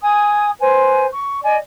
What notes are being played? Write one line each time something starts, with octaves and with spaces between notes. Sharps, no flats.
G#5 D#6
B4 C5 G#5
C#6
D5 D#5 G#5